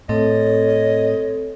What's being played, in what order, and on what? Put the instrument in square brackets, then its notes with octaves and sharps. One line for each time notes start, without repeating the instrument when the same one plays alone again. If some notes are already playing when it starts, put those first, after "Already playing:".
[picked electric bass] A2 [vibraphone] C4 A4 [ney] C#5 [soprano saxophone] D#5